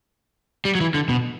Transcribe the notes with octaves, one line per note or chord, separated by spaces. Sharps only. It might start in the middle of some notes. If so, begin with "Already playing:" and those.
G3
F#3
E3
D3
B2